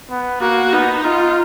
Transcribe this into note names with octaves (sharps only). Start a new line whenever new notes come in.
B3
A#3 F#4
B3 D#4
D#4 F4